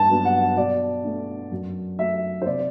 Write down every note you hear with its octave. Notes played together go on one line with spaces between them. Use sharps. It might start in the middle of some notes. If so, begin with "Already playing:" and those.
Already playing: G2 A5
F#3 B3 D4
F#5
B2 D5
A3 D4
F#2
F#3 A3 E5
C5
C3 D5